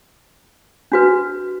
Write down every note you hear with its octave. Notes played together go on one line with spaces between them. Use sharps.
D4 F#4 B4